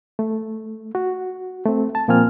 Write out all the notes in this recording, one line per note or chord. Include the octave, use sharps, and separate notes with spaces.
A3
F#4
A3 C4
A5
A#2 F3 A#3 C4 G#5 F6